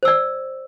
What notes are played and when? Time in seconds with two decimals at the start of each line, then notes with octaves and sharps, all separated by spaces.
0.03 C5
0.05 E6
0.08 D5